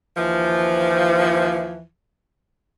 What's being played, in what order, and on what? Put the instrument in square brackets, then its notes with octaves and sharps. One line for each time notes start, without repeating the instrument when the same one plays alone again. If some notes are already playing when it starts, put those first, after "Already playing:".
[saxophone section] D#2 E3 F3